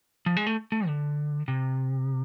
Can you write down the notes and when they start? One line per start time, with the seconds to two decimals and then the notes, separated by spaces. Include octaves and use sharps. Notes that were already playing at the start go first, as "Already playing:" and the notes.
0.26 F3
0.37 G#3
0.47 A3
0.72 A3
0.87 D3
1.48 C3